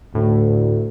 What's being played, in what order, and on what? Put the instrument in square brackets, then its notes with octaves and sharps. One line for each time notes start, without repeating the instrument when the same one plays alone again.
[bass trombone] D2 [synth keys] A2